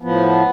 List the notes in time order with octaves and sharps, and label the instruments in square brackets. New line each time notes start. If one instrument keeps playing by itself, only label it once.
[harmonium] A2 F3 B3